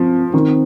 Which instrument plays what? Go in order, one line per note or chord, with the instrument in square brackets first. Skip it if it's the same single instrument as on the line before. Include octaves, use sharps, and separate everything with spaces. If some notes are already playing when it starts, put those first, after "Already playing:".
Already playing: [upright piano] F3 [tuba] C4
[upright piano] D#3 [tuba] C4